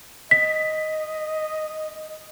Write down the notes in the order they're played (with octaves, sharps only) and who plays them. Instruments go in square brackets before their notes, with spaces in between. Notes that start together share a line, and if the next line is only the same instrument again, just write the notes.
[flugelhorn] D#5 [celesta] B6